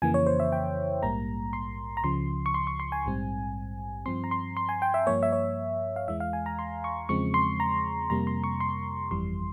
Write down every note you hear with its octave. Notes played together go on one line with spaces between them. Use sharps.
F2 C#3 E3 A#3 G#5
C#5
C5
E5
G5
A#1 G#2 G3 A#3 A#5
C6
A#5
C#2 C#3 F3 C6
C#6
C6
C#6
C6
G#5
A#1 G#2 G3 C4
G2 F3 C4 C6
A#5
C6
C6
G#5
G5
E5
G2 F3 A#3 C#5
E5
C#5
F5
E2 E3 G#3 E5
F5
G#5
A#5
C6
C#6
E2 C#3 F3 G#3 C4 C#6
C6
A#5
F2 C3 G3 A#3 A#5
C6
C#6
C6
G1 F2 E3 G3 C6